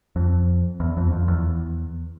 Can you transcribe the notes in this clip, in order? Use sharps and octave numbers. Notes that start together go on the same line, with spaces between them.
F2
E2
F2
F2
E2